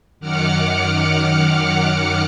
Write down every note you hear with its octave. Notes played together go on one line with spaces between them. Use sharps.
F#2 D#3 F#5 D6 F6 C#7